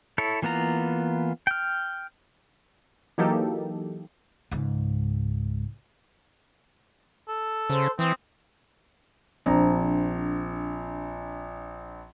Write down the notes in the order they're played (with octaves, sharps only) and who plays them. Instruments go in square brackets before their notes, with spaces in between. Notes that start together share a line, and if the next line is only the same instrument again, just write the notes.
[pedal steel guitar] E4 A4 C#5
E3 A#3 B3 F4 A#5
G5 F6
[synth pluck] E3 F#3 A#3 D#4 G4 A4
[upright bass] C#2 G#2
[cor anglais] A4
[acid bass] C#3 [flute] C5
[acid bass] E3 [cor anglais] C4 [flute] D#6
[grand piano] A#1 A#5 [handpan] C4 D4